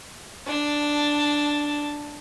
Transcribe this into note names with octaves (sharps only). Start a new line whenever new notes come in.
D4 A5